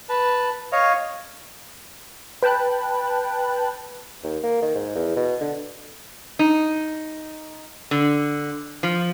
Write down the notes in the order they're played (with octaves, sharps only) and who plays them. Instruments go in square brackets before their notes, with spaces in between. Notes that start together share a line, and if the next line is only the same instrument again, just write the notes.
[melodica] B4 A5
C#5 D#5 F5
[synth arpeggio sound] B4 G5 A5 F#6
[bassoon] D#2
A#3
D#3
G#2
E2
B2
D3
[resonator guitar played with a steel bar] D#4
D3
F3